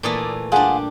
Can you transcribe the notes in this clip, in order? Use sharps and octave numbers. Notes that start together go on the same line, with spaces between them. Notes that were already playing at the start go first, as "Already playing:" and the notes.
A#2 E3 A3 D5 D#6
G3 D4 F4 G#4 F#5